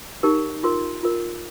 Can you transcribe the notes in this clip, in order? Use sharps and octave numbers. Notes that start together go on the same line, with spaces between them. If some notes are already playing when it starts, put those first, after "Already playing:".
D#4 G4 A#4
F4 A#4 C6
F4 A#4